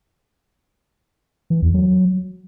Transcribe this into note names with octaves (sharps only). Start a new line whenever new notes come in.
E3
E2
F#3